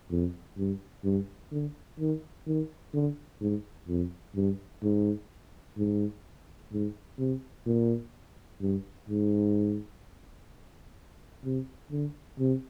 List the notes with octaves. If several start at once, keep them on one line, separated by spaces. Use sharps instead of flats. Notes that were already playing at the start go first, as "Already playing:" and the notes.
F2
G2
G2
D3
D#3
D#3
D3
G#2
F2
G2
G#2
G#2
G#2
C3
A#2
G2
G#2
C3
D3
C3